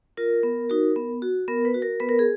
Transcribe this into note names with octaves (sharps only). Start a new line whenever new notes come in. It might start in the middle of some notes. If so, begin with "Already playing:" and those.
F4 A#4
B3
D#4 F#4
B3
F#4
B3 A#4
B4
F#4
A#4
B3 B4
A#4
G#4